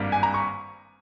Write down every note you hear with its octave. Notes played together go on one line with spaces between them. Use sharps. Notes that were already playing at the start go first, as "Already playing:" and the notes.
Already playing: G#1 G2 G3 A#3
G#5
A#5
C#6